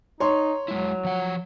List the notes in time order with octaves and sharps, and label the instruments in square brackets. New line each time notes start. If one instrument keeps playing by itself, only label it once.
[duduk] D#4 [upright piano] C#5 C6
[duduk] F#3 [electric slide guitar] G#3 E4
[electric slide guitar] F3 F#5